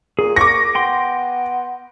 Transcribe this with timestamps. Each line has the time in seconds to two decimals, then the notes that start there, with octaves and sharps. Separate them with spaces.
0.19 A#2 G#4
0.36 C#6 D6 A#6
0.75 B3 G5 C6